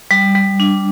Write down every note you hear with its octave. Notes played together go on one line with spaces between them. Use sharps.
G3
G3
D4